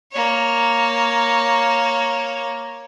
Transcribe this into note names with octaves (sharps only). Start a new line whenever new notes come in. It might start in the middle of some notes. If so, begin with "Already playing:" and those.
A#3 C#5